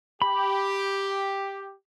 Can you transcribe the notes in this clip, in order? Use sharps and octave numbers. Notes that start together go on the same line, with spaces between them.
G4 B5